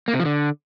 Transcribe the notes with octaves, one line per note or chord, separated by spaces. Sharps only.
A#3
C3
F3
D3